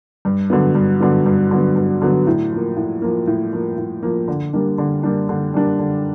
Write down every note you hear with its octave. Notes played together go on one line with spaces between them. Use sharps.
G2
D3 F#3 B3
G2
D3 F#3 B3
G2
D3 F#3 B3
G2
D3 F#3 B3
A2
F3 A#3
A2
F3 A#3
A2
F3 A#3
A2
F3 A#3
D3
G3 A#3 D4
D3
G3 A#3 D4
D3
G3 A#3 D4
D3